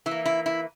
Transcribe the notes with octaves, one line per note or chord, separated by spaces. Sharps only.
E3 E4
A#3
E4
E4